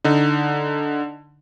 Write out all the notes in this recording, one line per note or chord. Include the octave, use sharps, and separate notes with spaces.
D3 D#4